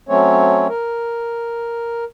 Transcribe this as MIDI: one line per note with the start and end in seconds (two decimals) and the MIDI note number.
0.09 0.67 54
0.09 0.67 57
0.09 0.67 60
0.09 0.67 61
0.09 0.67 73
0.69 2.04 70